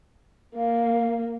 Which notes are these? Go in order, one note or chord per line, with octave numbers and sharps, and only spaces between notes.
A#3 F5